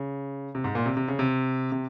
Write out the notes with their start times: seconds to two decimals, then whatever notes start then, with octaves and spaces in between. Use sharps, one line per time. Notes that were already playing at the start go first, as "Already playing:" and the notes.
Already playing: C#3
0.55 C3
0.64 G#2
0.75 A#2
0.86 C3
0.97 C3
1.08 C#3
1.19 C3
1.72 C3